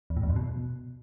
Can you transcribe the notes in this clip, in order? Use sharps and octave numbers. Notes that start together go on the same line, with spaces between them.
E2
A2
E2
F2
B2